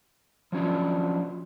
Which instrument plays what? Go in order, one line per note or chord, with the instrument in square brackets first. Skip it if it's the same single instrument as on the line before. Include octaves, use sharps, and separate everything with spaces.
[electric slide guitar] F3 F#3 C#4 D4 F4